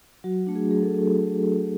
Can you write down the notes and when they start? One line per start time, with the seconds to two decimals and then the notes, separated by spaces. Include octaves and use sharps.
0.24 F#3 F#4
0.47 A3 D4
0.55 G#4
0.71 F#3 G#4
0.83 A4